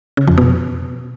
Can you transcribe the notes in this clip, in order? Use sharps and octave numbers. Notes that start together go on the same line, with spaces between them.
C#3
F2
B2